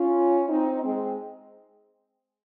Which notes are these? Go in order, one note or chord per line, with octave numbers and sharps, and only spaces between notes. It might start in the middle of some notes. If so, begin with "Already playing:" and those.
Already playing: C#4 F4
C4 D#4
G#3 C4